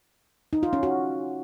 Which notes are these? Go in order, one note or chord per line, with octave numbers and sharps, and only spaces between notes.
D#4
F4
C#4
F#4